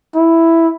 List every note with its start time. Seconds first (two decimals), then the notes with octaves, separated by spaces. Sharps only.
0.15 E4